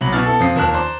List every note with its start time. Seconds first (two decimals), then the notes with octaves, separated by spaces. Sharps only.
0.01 C2 F#3 B5 F#7
0.13 B2 E4 G#5 F6 A6
0.26 B3 A4
0.40 F2 C4 F4 D#6 C7
0.55 D#2 F3 A#4 A5 F#6
0.74 C5 D5 A#5 C6